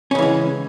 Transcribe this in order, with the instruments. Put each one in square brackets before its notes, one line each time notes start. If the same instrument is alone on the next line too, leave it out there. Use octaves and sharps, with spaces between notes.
[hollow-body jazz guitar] C#4
C#3
E3
G#3